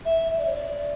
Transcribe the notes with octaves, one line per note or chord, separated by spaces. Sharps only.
E5
E5
D5
C#5
D5